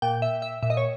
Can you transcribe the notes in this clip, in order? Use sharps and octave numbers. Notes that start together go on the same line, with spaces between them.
A#2 G5
E5
E5
A#2 E5
D#5
C#5